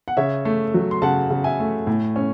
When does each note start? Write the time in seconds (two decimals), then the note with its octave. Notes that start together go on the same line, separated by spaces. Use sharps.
0.08 F#5
0.17 C#3 C#5 E5
0.45 A3
0.74 F#3
0.91 C6
1.02 C#3 F#5 A5
1.30 C#3
1.44 E5 G#5
1.60 A3
1.87 A2
2.16 C#4